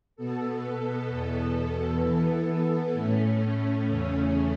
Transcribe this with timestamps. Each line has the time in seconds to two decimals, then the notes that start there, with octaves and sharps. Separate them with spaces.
0.16 B2 B3 A4
1.09 E2 B2 B3 A4
2.01 E3 B3 A4
2.93 A2 A3 C#4
3.86 E2 C#3 A3 C#4